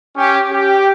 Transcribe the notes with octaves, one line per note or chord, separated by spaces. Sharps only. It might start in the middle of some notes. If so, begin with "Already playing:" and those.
C#4 G4
G4